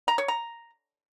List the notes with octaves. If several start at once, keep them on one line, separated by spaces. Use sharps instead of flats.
A#5
C#5
A#5